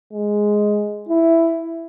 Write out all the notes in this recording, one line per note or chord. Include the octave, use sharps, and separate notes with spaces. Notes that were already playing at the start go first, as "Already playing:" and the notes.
G#3
E4